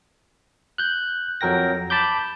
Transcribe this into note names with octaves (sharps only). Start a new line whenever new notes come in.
F#6 G6
F2 F#3 A#4 G5 A#6
A5 B5 D6 G6